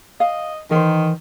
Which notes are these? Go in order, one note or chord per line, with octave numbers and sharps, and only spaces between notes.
D#5 F5
D#3 E3 A#4 C5